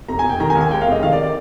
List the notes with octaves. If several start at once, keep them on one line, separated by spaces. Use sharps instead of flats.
F1 A#5
G#5
F1
G5
D#3 A#5
G#5
D#2
G#5
G#3 G5
F5
F1 D#5
D#3 F5
D5
D5